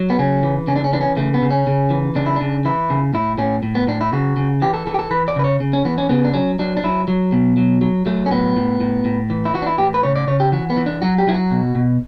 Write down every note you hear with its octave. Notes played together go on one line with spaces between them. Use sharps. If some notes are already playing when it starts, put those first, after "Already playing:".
Already playing: F#3
B3
C#3 C#4
E3
C#3 C#4
D4
C#4
E3 D4
C#4
C#3 A3
B3
C#3
C#4
C#3
E3
C#3 D4
E4
C#3 D4
E3 E4
C#3
A2 E4
A2 C#4
A2
B3
A2 D4
E4
C#3 F#4
C#3
E3 G4
A4
E3 A4
G4
A4
E3 B4
D5
C#3 B4
C#5
C#3
C#4
E3 B3
C#4
C#3 B3
D4
F#3 C#4
F#3 D4
D4
F#3 E4
F#3
B2
F#3
F#3
F#3 A3
C#4
A2 B3
A2
A2
A2
E3
E4
E3 F#4
D4
E4
A2 G4
B4
C#3 C#5
D5
C#3 C#5
G4
E3 F#4
B3
E3
D4
F#3 F#4
G4
F#3 E4
F#4
B2
B2